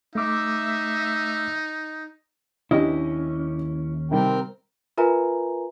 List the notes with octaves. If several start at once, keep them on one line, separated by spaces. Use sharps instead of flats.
A3 D#4 E5 D6
D#2 C#4 D4 E4 G4 D#5
C3 D#3 G3 C4 A#4 G5
F4 A#4 B4 E5 G#5 A#5